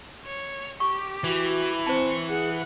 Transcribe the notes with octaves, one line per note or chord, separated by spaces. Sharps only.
C#5
G4 C#6
E3 F#4
C4 C5 A5 C#6
G#4 F#5